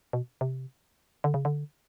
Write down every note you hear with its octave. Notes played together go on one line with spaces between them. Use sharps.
B2
C3
D3
C#3
D3